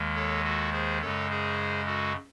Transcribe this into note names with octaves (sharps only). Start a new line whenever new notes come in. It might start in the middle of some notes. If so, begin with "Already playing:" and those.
Already playing: D#2 D#3 G#3
A4 C#5
F#4 A4
G#4 C5
F#2 C#3 G#3 A4 C#5
G#4 C5
F#4 A4